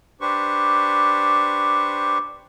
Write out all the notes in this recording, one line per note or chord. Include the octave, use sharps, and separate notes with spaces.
D4 G4 B4 C5 C#6